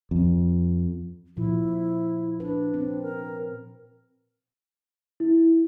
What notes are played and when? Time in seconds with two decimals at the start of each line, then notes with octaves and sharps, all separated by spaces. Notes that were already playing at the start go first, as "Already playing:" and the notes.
0.11 F2
1.37 A#2 F3 E4
2.40 D4 B4
2.74 C4
3.02 A#4
5.20 E4